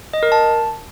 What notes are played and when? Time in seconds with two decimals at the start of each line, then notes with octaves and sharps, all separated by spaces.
0.13 D#5
0.23 A#4
0.32 A5